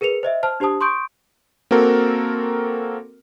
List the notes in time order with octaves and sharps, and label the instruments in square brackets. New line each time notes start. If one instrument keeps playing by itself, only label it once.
[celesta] G#4 A#4 B4 C#7 F7
C5 D#5 E5
C5 A5 F6
D4 G4 C5 A5 D#6
C6 C#6 D#6 G6 D7
[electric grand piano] A#3 C4 F#4 A4 A#4